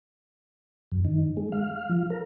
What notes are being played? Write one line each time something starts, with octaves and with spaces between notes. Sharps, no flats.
F#2
D#3
G#3
F5
F3
A#4